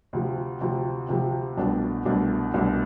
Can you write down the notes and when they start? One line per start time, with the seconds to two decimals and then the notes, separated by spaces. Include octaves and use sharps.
0.13 D2 C3 F3
0.61 D2 C3 F3
1.09 D2 C3 F3
1.57 C2 B2 A3 D4
2.05 C2 B2 A3 D4
2.54 C2 B2 A3 D4